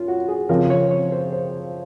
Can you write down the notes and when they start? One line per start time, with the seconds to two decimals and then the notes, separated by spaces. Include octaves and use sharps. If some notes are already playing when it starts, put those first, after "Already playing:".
Already playing: F#2 F4
0.08 F#4
0.28 G#4
0.49 C#3 F3 C4 A#4
0.70 C#5
0.91 C#5
1.12 C5
1.32 C5